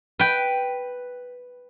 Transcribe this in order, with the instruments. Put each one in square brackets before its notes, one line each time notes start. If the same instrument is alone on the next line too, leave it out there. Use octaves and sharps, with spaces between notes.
[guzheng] B4 G5